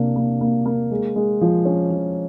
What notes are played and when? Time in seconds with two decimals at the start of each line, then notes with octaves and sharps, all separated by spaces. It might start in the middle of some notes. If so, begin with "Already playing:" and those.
Already playing: C3 A#3 D4
0.16 A#3
0.41 A#3
0.66 A#3
0.91 G#3
1.16 G#3
1.41 F3
1.65 C#4
1.91 F3